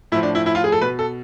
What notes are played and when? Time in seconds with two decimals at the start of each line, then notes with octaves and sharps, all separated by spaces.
0.12 A2 E4
0.15 F3
0.23 D4
0.35 E4
0.46 E4
0.55 F4
0.64 G#4
0.72 A4
0.81 B2 B4
0.99 A4